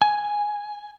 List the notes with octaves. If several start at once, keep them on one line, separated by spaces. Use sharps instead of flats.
G#5